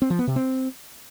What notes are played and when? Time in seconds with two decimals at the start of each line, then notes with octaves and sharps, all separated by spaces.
0.02 C4
0.10 F3
0.19 B3
0.27 C3
0.36 C4